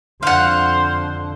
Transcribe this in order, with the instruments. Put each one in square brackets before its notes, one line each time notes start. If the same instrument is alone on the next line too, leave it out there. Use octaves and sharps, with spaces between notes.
[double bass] F2 D3 [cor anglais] C5 [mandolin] F5 F#5